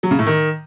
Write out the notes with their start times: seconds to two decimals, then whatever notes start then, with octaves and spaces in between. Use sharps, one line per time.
0.03 F#3
0.11 C#3
0.19 A2
0.27 D#3